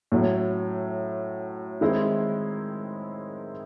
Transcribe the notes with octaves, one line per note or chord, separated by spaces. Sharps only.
A2 F#3 C#4
D#3 G#3 C4 E4